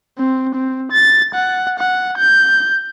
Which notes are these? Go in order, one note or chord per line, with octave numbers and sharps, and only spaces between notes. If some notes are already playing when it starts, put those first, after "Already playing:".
C4
C4
A6
F#5
F#5
G6